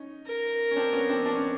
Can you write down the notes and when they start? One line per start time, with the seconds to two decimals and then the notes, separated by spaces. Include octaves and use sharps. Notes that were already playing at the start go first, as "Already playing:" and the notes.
Already playing: C#4 D#4
0.26 A#4
0.71 C#4
0.76 C4 D4
0.93 B3 C#4
1.09 C4 D4
1.26 D4
1.35 C#4